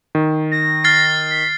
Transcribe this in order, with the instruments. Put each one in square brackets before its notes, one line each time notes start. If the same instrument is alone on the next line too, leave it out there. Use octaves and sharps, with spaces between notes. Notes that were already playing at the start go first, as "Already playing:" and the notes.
[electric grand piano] D#3
[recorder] A#6
[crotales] F6 A6 C7
[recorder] B6